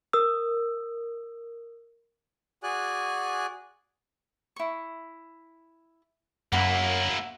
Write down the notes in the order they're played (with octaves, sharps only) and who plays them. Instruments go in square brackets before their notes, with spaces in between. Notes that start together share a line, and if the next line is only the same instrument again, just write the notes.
[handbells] A#4 D#6 E6
[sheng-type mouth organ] F#4 G#4 D5 G#5 F#6
[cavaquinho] E4 C#6
[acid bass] F#2 [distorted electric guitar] A#3 E4 [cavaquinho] F#4 A#4 B5